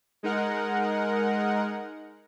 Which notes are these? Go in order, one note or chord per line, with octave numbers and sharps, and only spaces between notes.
G#3 D#4 A#4 F#5